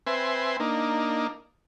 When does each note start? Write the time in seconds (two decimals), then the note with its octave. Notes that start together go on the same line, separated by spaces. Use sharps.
0.07 C4 B4 E5 G#5 C6
0.60 A#3 D4 D#4